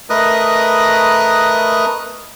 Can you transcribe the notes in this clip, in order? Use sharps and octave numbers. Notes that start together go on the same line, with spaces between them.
A3 A#4 B4 D#5 D#6 F#6